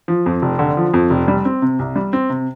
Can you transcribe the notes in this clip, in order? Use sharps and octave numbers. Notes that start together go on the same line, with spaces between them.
F3
F2
F1
D3
F3
F2
F1
G3
C4
C3
C2
G3
C4
C3